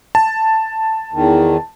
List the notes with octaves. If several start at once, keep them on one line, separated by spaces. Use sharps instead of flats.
A5
E2 D#3